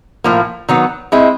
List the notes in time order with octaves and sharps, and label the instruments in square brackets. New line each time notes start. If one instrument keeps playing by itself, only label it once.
[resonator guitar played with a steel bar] A2 F3 A#3
D#3 F#3 B3
G#3 C4 E4